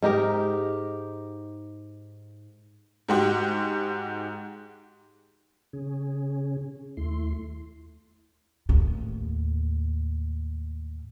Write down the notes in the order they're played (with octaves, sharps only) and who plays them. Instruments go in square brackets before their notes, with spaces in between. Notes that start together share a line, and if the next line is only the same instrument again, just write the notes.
[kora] G#2 D#4 G4 A#4
[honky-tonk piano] G#2 G#3 F#4 G4
[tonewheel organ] C#3 C#4 G#4
D#2 A3 E4 C6
[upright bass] D#2 A2